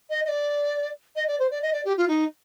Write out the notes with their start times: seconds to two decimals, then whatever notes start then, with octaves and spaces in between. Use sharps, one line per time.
0.10 D#5
0.25 D#5
0.28 D5
1.15 D#5
1.27 D5
1.39 C5
1.50 D5
1.62 D#5
1.73 D5
1.85 G4
1.97 F4
2.08 D#4